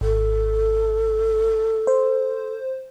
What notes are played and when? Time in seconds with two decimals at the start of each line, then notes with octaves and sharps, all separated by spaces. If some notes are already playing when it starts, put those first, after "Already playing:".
0.01 G#1 A4
1.87 C5